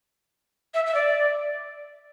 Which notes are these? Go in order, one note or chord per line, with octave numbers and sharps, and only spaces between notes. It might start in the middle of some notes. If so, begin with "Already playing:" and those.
E5
E5
D5